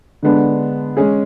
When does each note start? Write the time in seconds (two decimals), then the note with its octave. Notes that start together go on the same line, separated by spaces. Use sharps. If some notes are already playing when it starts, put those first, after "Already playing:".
0.23 D3 G#3 B3 D4
0.97 G#3 C#4 G#4